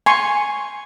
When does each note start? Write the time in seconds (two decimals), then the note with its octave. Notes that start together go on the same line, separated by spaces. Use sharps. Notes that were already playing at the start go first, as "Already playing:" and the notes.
0.06 G#5 C6 C#6